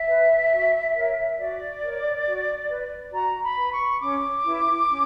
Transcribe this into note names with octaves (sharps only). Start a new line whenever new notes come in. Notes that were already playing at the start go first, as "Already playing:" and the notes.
Already playing: E5
B4
F#4
A#4 C#5
F#4 D5
A#4 C#5
F#4
B4
F#4 A#5
B5
B4
C#6
C#4 D6
E4 B4
C#4